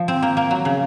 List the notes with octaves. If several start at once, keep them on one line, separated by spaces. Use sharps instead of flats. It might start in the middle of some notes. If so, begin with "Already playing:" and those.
Already playing: F3
C4
A#3
A#3
F#3
C#3